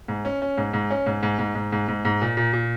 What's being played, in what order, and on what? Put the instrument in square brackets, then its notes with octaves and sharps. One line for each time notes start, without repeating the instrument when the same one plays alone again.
[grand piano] G#2
C#4
C#4
G#2
G#2
C#4
G#2
G#2
G#2
G#2
G#2
G#2
G#2
A#2
A#2
A#2